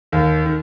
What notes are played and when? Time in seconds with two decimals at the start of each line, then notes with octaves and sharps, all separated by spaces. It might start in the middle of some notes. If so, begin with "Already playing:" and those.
0.12 D#2 D#3
0.46 D#3